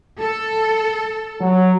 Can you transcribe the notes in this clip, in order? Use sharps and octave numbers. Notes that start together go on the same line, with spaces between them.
A4
F#3